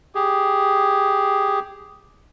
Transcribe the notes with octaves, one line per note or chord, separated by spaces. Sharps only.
G4 G#4